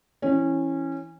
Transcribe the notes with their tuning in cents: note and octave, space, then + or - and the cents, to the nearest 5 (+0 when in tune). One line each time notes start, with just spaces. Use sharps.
E3 +0 C#4 -20